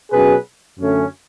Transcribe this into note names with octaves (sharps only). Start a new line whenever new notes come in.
B2 F#3 C#4 G#4 B4
F#2 D3 A3 C#4